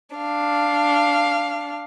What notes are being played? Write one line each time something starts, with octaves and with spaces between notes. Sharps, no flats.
D4 F5